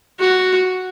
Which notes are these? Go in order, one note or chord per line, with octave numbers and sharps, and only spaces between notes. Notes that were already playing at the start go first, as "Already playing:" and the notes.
F#4